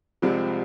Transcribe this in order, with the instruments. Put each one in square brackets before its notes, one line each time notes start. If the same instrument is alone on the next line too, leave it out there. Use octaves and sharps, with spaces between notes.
[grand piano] C2 C3 F3 G#3 C4